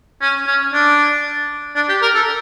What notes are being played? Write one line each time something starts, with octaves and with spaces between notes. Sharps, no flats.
C#4
C#4
D4
D4
G4
A#4
A4